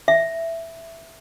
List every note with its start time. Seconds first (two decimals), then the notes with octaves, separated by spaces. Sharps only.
0.08 E5